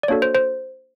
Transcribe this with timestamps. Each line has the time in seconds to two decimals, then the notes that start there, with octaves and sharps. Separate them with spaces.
0.03 D5
0.08 A#3 D4 F#4 A4 C#5
0.22 C5
0.35 C5